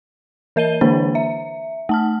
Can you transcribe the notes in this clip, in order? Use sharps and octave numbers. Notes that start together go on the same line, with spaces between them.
E3 A#4 D#5 D#7 G7
D3 E3 A#3 D4 C5
E5
A3 A5 F6